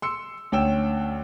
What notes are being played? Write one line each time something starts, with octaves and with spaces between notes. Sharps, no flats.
C6 E6 C#7
D2 C#4 G5 E6 E7